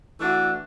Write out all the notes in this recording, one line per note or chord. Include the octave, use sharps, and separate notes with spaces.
E3 A3 D4 F#4